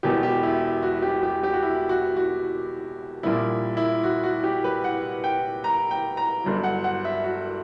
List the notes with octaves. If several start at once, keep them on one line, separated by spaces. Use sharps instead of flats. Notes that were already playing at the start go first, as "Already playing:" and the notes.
E1 E2 B2 G4
G4
E4
F#4
G4
G4
G4
F#4
E4
F#4
F#4
A#1 A#2 G3 E4
E4
F#4
F#4
G4
B4
F#5
G5
A#5
G5
A#5
G1 G2 F#3
F#5
F#5
E5
F#4